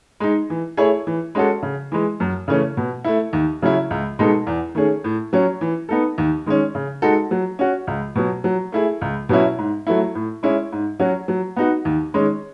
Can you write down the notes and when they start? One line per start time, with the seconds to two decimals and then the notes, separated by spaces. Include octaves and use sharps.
0.20 G#3 D#4
0.50 E3
0.77 A3 E4 G#4 C#5
1.07 E3
1.35 G#3 C#4 F#4 A4
1.63 C#3
1.92 E3 G#3
2.20 F#2
2.48 C#3 E3 A3 C#4
2.77 B2
3.05 A3 E4
3.33 D#2
3.62 C#3 F#3 C#4 E4
3.91 C#2
4.19 B2 G#3 D#4 A4
4.47 E2
4.75 D#3 A3 C#4 G#4
5.04 A2
5.33 F#3 C#4
5.61 E3
5.89 B3 D#4 A4
6.18 D#2
6.46 D#3 G#3 C#4
6.75 C#3
7.02 G#3 D#4 F#4 A4
7.31 F#3
7.59 C#4 F#4
7.87 C#2
8.15 B2 F#3
8.44 F#3
8.72 A3 E4 G#4
9.01 C#2
9.29 B2 F#3 C#4 E4
9.58 G#2
9.87 F#3 A3 E4
10.15 A2
10.43 G#3 C#4 E4
10.72 G#2
11.00 F#3 C#4 F#4
11.28 F#3
11.57 B3 D#4 F#4
11.85 D#2
12.14 D#3 G#3 C#4